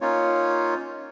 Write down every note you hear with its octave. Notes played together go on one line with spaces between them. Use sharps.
A#3 C#4 D#4 F4 C#5